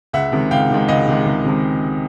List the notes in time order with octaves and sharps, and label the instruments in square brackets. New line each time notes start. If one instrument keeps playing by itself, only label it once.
[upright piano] C#2 E5 F#5
C3 D#3 G#3
C#2 F5 G5
C3 D#3 G#3
C#2 D#5 F5
C3 D#3 G#3
C#2
C3 D#3 G#3